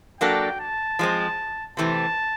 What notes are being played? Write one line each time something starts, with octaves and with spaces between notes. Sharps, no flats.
F#3 A#3 D4 F#4 A4 G5
A5
F3 G#3 C4
C3 E3 A3 C4 A5